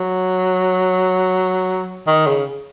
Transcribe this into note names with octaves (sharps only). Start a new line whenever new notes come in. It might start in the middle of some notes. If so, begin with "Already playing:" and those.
Already playing: F#3
D#3
C#3